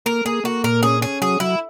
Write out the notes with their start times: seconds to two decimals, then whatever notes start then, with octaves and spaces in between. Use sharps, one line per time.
0.06 A#3 A#4
0.25 A#3 G#4
0.44 A#3 F#4
0.64 A#2 A#4
0.83 C#4 G#4
1.01 C#4 G#4
1.22 F#3 G#4
1.40 F#3 E4